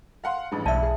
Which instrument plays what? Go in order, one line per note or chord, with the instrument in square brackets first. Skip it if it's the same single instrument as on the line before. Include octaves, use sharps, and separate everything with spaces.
[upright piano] F5 F#5 C6
A1 G2 G#3
[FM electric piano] B1 E5 [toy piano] D5 F5 A5
[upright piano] G#4